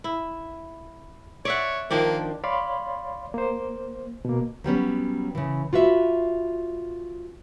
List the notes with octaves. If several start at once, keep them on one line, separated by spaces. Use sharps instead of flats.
E4
C#5 D5 E5 F#5
D#3 F3 A#3 D4
C#5 D5 F5 B5 C6
A#3 C5
B2 A#3
F#3 G3 B3 C#4
C#3 E3
F4 F#4 B4 E5